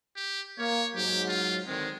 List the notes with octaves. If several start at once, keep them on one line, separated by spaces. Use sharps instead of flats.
G4
A#3 C#5
G#2 F#3 G4
F4
D3 D#3 G#3 C4